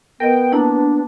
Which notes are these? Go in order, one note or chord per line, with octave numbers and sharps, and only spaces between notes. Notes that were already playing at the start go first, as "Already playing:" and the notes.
B3 A#4 D#5 G5
A#3 D4 E4